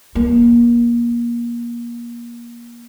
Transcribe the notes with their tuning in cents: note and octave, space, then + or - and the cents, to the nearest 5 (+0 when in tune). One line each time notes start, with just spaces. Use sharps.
A#3 +30